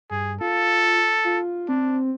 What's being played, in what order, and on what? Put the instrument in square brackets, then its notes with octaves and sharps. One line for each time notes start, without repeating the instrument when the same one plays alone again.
[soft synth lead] G2 [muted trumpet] G#4
[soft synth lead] F4 [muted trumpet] A4
[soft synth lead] F4
[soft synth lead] C4 [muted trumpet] D4